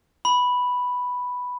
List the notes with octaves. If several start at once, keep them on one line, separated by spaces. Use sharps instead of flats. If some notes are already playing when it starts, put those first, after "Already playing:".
B5